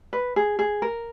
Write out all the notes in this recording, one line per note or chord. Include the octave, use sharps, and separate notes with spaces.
B4
G#4
G#4
A#4